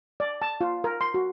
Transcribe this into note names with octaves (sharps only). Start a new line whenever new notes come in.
D5
A5
F4
A#4
C6
F#4